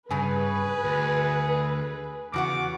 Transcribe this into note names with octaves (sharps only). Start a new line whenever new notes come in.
G2 C#3 G#4 B4 G#5
D2
E2 C#3 F#4 F#5 D6